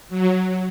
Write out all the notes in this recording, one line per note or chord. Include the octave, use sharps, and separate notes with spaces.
F#3